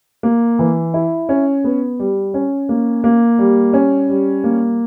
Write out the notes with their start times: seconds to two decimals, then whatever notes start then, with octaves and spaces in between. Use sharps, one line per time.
0.23 A#3
0.59 E3
0.94 E4
1.29 C#4
1.64 B3
1.99 G3
2.34 C#4
2.69 A#3
3.04 A#3
3.39 G3
3.73 C#4
4.09 G3
4.44 A#3